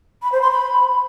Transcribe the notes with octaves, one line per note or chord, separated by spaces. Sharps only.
B5
C5
C6
B5